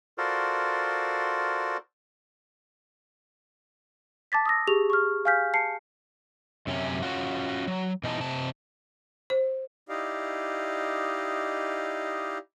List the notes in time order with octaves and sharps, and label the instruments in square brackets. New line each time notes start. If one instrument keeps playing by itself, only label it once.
[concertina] F4 F#4 A4 A#4 C5 D5
[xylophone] A5 D6 A6 B6
D#6 E6 A#6
G4 G#4 C#6 F7
C#6 F6
F5 G#5 F6 G6 B6
A5 C7 C#7
[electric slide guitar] F#2 C3 C#4
C#4 F4 F#4
F#3
B2 E3 D#4 G#4 A5
C3 A5
[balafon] C5
[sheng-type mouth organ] D#4 E4 G4 D5 D#5 F5